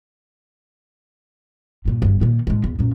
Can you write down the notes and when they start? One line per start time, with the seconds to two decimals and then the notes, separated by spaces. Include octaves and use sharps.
1.85 G2 A#2
2.02 G1 G2
2.21 A#2 D#3
2.47 A2 G#3
2.64 E2
2.79 F#2 A#2